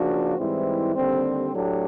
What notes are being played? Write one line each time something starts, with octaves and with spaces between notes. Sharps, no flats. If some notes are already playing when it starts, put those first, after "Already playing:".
Already playing: C#3 F3 A#3 D4 F#4
G#2 E3 G3 C4 E4
D#2 D3 G3 C4
A2 F#3 A3 D4 G4